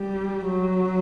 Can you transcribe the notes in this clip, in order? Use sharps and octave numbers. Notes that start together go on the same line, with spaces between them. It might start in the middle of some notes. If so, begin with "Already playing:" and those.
Already playing: G3
F#3